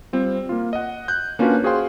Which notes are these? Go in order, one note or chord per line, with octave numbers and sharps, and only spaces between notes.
G3 C4 F4
A#3 F4
D#5 F#5
F#6 G6
A#3 C#4 D4 F4 F#4 B4
F#4 G#4 C5 F5 G5 C6